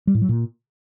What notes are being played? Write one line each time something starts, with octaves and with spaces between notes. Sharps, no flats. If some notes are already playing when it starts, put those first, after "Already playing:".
G3
A2
F#3
A#2